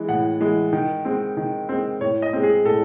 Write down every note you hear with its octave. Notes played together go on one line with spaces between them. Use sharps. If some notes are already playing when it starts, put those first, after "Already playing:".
Already playing: E3 G#3
A2 F#5
E3 G#3
D#3
G#3 C4
D#3
G#3 C4
A2 C#5
D#5
G#3 C4
G#4
A2 A4